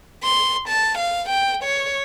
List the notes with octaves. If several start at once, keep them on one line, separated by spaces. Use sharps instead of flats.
C6
A5
F5
G5
C#5